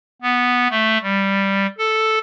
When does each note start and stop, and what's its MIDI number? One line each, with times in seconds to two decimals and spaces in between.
0.22 0.68 59
0.70 0.98 57
1.03 1.67 55
1.78 2.19 69